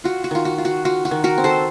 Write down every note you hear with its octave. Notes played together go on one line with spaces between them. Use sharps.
F4 F#4
F#4
D#3 F4
F#4
F4
F#4
F4 F#4
F#4
D#3
F#4 A#4
C4
A4 C5